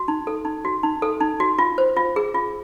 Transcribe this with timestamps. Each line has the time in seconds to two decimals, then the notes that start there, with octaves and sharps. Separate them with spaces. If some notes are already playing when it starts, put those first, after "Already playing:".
Already playing: F#4
0.08 D#4
0.27 A4
0.45 D#4
0.65 F#4
0.83 D#4
1.02 A4
1.20 D#4
1.40 F#4
1.59 F4
1.78 C5
1.97 F4
2.16 G#4
2.34 F4